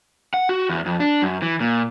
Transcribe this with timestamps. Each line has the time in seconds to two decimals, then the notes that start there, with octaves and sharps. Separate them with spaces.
0.34 F#5
0.49 F#4
0.70 E2
0.86 F2
1.00 D4
1.22 F#2
1.42 E3
1.60 A#2